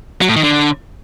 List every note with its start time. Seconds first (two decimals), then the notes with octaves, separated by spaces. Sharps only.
0.21 F#3
0.29 A2
0.36 D#3
0.44 D3